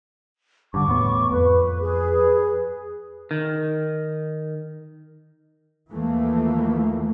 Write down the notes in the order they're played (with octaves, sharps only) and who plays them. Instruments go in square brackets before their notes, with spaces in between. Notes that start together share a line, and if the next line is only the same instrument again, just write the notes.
[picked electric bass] G2 D3 [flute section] C#6 D6
[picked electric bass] E2 A2 B3
[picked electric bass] F2 [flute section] B4
[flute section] G#4 B4
[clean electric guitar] D#3
[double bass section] D#2 E3 F3 A3 A#3